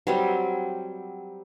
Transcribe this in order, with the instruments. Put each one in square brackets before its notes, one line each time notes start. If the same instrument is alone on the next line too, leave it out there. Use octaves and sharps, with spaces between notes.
[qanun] F#3 G3 C4